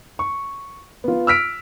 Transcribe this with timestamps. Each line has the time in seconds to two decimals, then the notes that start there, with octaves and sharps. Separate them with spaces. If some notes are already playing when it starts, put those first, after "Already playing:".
0.19 C#6
1.04 B3 F4
1.27 E6 F6 B6 D7